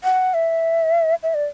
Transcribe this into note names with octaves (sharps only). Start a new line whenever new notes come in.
F#5
E5
E5
D5